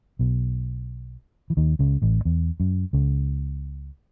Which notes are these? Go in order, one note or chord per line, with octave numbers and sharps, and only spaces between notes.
B1 B2
E3
D#2 D#3
C#2 C#3
A1 A2
E2
F#2
C#2 C#3